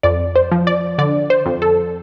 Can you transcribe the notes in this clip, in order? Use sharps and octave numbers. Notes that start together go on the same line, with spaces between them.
F2 D5
C5
F3
D5
D3 D5
C5
F2
A4